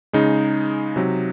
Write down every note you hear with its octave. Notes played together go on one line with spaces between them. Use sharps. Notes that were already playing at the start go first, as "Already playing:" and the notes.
C#3 G#3 D#4
C3 F#3